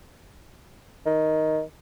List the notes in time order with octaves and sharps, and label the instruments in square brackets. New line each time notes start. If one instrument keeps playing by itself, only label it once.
[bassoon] D#3